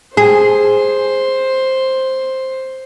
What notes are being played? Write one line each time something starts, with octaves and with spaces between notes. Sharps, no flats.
G#4 C5